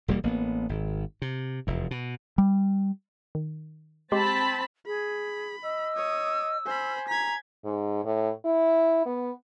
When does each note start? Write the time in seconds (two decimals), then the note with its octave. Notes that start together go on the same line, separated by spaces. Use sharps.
0.08 E1 D#2 G3 A#3
0.24 A1 A#3 B3
0.69 G#1
1.22 C3
1.67 F1 E2
1.91 B2
2.38 G3
3.35 D#3
4.12 G#3 C4 G4 A5 B5 C6
4.86 G#4 B5
5.63 D#5 E6
5.96 C#5 D#6
6.65 C5 G#5 B5
7.08 A#5 G#6 B6
7.64 G#2
8.05 A2
8.45 E4
9.06 B3